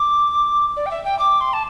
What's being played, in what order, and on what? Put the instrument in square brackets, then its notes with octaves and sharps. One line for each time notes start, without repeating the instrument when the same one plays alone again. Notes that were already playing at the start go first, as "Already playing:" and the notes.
Already playing: [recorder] D6
D5
G5
E5
G5
D6
C6
A5